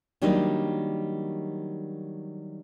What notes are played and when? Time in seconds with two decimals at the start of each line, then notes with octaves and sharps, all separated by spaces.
0.22 D#3 F#3 G3 A#3 D4 D#4